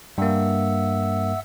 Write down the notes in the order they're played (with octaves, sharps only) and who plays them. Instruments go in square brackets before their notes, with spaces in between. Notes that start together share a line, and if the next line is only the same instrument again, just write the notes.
[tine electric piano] G2 A#3 [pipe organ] E5 F#5 E6